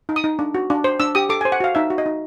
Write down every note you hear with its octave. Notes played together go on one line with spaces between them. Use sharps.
D#4
D#6
D#4
D4
F#4
D4
C5
D4 E6
G4 D#6
A4 D6
C5 G#5
F#5
F#4 F5
D#4 E5
F#4
D#5
D#4